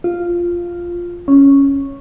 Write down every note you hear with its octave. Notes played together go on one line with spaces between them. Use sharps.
F4
C#4